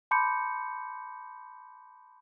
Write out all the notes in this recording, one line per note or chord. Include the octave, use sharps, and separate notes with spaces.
A5 B5 C6 D6 G6 C#7